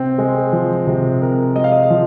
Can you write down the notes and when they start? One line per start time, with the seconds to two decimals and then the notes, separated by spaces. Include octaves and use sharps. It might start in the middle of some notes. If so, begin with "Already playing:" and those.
Already playing: C3 C4
0.18 G#3
0.52 F3
0.87 C3
1.21 C4 A#4
1.56 G#3 D#5
1.64 F5
1.72 D#5
1.90 F3